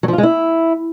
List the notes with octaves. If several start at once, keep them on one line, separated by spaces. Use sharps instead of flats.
F#3
F3
F4
G#3
E4